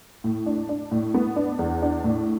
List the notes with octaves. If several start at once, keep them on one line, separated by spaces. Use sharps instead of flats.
A2
D4
D4
A2
B3
D4
E2
D4
A2